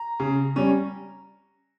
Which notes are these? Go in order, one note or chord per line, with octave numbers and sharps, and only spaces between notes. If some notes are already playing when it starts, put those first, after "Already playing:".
Already playing: A#5
C#3
G3 C#4